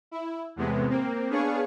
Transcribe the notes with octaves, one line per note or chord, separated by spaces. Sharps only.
E4
E2 A2 C3 G#3 B3
A#3 C4
B3 D4 G#4 C#5 F5 C#6